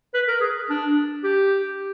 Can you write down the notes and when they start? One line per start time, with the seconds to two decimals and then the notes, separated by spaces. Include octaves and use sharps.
0.14 B4
0.28 A#4
0.41 G#4
0.70 D4
1.24 G4